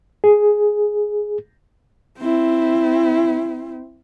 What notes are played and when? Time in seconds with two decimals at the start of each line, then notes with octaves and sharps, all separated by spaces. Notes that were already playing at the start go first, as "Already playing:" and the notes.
0.24 G#4
2.20 C4 E4